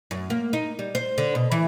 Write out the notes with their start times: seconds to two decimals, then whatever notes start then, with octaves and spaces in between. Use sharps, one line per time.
0.11 F#2
0.30 A#3
0.53 D#4
0.79 G3
0.95 C5
1.18 D3
1.35 B2
1.52 E3